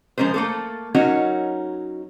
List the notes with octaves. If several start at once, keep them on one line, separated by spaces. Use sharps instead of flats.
F3 G#3 C#4 A#4 C5
A3 A#3 A4
F#3 C#4 D#4 F#4 A#4 C#5